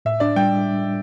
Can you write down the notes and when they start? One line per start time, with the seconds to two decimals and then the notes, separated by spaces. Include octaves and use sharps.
0.05 A2 E5
0.20 D4 D5
0.36 G3 G5